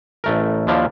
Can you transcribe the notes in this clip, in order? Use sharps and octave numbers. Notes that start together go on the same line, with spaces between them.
A1 A3 A#4
D#2 F3 D4 E4 F5